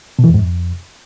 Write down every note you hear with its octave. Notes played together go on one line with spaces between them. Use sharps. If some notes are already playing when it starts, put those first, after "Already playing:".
B2
E3
E2
G#2
F2